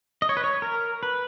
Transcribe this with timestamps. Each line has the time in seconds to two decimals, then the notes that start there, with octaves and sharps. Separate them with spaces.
0.22 D#5
0.29 C#5
0.37 B4
0.44 C#5
0.62 A#4
1.03 B4